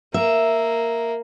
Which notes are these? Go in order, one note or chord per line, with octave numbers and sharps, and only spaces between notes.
A#3 E5